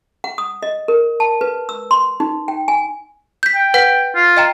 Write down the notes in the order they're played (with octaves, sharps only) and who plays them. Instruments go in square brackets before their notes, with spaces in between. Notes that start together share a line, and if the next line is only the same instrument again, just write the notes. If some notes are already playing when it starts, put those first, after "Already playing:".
[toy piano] F#5
D#6
D#5
A#4
A5
B4
E6
C6
D#4
G5
G#5
[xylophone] G6 B6
[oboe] G5
[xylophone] B4 F#5 B6
[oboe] F4
[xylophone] D#5 G5 A#5